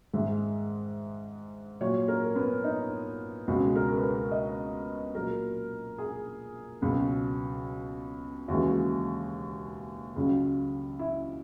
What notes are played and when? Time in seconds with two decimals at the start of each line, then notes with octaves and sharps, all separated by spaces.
0.14 G#2 D#3 G#3 E5
1.81 A#2 F#3 C#5
2.08 A#4
2.36 B3
2.64 D#4
3.48 C#2 B2 G#3 F#4
3.76 A#4
3.97 B4
4.03 A#4
4.31 D#5
5.15 A#2 F#3 A#4
5.98 G#4
6.81 C#2 B2 F#3
8.48 D#2 C#3 E3 G#3 F#4
10.16 C#2 C#3 F#3
10.99 E4